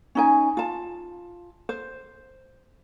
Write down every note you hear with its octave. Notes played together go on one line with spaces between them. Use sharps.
C#4 D#4 G#5
F4 A5
C5